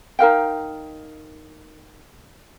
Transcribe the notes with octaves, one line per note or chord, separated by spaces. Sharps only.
D#4 A#4 F5 G5